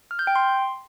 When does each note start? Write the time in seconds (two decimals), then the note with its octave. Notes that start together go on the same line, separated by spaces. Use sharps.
0.11 F6
0.19 G6
0.27 G5
0.36 C6